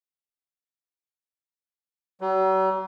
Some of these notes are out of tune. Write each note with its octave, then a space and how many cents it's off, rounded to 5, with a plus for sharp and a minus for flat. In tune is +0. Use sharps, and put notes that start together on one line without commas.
F#3 +45